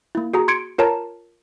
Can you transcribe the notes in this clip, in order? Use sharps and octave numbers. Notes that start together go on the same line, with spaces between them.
A#3 E4
F#4 G#4 A#5
C6 G#6 C#7 D7
F4 A#4 C#5 A5 A#5